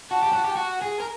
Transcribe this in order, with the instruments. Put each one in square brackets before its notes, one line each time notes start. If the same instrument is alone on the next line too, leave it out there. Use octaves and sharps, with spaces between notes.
[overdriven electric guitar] F#4 [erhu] A5
[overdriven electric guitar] G4
F#4
G4
F#4
G#4
A#4